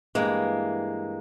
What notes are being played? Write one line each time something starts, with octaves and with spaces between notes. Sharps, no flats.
G2 E3 G#3 A#3